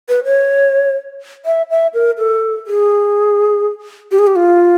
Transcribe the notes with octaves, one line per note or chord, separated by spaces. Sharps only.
B4
C#5
E5
E5
A#4
A4
G#4
G4
G#4
G4
F4